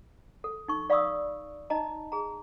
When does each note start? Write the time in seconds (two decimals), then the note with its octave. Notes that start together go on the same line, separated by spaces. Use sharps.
0.44 A4
0.68 D#4 C#6
0.90 D5 F5 B5 C#6 D#6 E6
1.70 D#4 D#5 A5 A#5
2.12 G#4 A#5